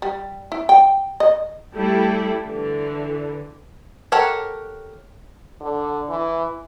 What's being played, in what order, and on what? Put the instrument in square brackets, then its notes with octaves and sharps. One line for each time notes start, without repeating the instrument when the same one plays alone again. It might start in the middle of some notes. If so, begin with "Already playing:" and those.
[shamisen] G3
E4
G5
D#5
[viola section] G3 A3 E4 G4 A4
D3 E3
[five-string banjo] G4 A4 A#4 C#5 F#5
[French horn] D3
E3